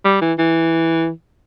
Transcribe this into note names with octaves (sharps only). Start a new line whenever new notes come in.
G3
E3
E3